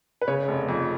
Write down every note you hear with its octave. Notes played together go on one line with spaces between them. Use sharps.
B4
C#3 C#5
F1
F2